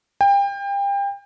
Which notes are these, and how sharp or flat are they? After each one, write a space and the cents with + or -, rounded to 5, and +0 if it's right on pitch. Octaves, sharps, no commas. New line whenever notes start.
G5 +30